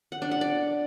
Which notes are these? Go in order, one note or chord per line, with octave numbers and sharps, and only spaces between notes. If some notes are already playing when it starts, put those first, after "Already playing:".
F#5
D4
F#5
D5